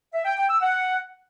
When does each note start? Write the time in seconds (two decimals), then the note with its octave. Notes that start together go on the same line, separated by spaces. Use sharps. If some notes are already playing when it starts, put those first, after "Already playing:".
0.13 E5
0.25 G5
0.37 G5
0.49 E6
0.61 F#5